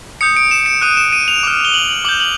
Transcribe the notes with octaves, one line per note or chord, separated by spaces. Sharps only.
D#6 G6 C#7
D7
E7
D7
D#6 F#6 D#7
E7
D#7
F7
D6 F6
G7
F#7
F#7
D6 G6 F#7
F#7